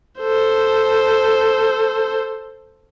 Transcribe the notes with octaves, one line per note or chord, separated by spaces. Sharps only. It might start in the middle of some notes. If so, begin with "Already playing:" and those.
A4 C5